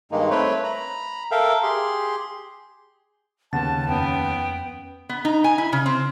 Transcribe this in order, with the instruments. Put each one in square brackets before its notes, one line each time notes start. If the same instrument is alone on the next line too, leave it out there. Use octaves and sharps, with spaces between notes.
[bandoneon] G2 D#3 G#3 A#3 D#4
A3 C4 B4 C#5 G5
A#5 B5
A4 A#4 E5 F5 G5
G4 G#4 C6
[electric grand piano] D#2 F#5 A6 [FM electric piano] C#3 B3 [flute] A5
[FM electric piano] F2 C#4 [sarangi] B3 [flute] G5
[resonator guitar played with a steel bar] B3
D#4
G#5
E4
C#3
C4